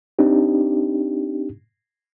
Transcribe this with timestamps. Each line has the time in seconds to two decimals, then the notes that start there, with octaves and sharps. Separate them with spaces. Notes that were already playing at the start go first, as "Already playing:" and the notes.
0.19 C4 D4 D#4 G4